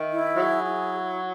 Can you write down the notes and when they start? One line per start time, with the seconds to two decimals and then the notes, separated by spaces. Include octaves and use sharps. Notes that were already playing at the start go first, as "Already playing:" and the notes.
Already playing: D#3 E5
0.11 E4
0.37 F#3 G#4
0.64 E4